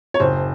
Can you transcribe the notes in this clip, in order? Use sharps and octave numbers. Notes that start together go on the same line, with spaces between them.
C#5
F#1 C5